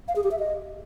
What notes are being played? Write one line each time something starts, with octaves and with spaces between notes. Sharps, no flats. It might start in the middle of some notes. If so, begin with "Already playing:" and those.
F5
G#4
G4
E5
D#5